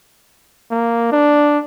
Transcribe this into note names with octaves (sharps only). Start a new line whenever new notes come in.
A#3
D4